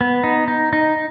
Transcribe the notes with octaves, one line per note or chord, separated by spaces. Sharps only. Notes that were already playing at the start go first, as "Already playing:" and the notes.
B3
D#4
D#4
D#4